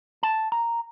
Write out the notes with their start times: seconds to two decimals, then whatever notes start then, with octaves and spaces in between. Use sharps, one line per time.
0.23 A5
0.52 A#5